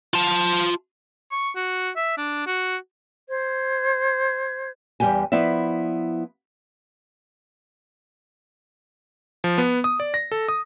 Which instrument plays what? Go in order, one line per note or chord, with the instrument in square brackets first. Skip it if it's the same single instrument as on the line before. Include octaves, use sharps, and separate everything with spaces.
[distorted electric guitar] F4 A5
[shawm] C#6
F#4
E5
D4
F#4
[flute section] C5 G#6
[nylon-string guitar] E2 G3 G4 G5 G#5
F3 B3 E4 D5 E5
[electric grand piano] F3
B3
D#6
D5
A#6
A4
D#6